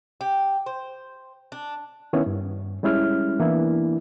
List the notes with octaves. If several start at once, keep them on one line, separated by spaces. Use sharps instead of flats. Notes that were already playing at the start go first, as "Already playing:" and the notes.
G4
C5
D4
D#3 B3 C#4 E4
G2
G3 G#3 C#4 E4 F6
E3 A#3 B3 D4 E4